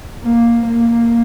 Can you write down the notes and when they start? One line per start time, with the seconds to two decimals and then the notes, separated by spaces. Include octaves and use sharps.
0.24 A#3
0.68 A#3